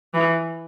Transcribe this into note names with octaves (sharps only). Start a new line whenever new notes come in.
E3